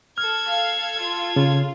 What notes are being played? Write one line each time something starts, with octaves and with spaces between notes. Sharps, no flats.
A4 F6 G#6
F5
F4
C#3